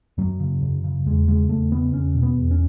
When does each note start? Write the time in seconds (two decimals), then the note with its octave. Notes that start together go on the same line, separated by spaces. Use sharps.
0.18 F#2 F#3
0.40 C#3
0.62 F#2
0.84 C#3
1.06 E2 G#3
1.28 C#3 G#3
1.49 E2 A3
1.71 C#3 B3
1.93 E2 C#4
2.15 B2
2.23 B3
2.37 E2
2.51 C#4